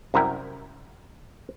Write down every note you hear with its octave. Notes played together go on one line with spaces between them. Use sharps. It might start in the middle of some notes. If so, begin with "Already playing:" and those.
C2 F#2 E4 A#4 G5